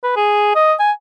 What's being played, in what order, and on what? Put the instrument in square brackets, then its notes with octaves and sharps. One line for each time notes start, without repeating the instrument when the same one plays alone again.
[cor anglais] B4
G#4
D#5
G#5